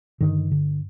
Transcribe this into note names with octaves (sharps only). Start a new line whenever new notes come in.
G2 D3 D#3
D3